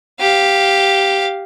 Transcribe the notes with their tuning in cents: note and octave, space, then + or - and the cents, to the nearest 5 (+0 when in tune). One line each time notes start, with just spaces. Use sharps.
G4 +0 F5 +0